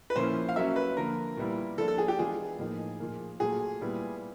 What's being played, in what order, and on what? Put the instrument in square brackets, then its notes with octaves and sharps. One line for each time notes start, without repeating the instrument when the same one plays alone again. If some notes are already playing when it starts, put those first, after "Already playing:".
[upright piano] B4
[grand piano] A#2 F3 A#3 C#4 E4 [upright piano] C5
[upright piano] F5
[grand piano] F#3 A#3 C#4 [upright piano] E5
[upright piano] B4
[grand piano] D3 F3 A#3 [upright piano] A#4
[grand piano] A#2 G3 B3 E4
[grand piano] F3 A#3 D4 F4 [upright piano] A4
[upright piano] A4
G#4
G4
[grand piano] E3 G#3 B3 D4 F4 [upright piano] G#4
[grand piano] A2 F3 A#3 D#4
A#2 F3 A#3
[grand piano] A#2 F#3 A3 [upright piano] G#4
[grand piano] A#2 G3 B3 E4